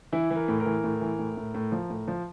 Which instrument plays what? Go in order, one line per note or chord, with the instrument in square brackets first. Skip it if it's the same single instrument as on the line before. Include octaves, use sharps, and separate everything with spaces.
[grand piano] E3 E4
E3
A#4
A2
A#4
E3
A2
E3
A2
A2
A2
F3
A2
F3